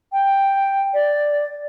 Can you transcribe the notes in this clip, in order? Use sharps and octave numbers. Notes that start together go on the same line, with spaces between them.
G5
D5